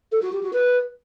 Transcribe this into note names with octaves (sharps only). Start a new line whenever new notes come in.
A4
F#4
G4
F#4
B4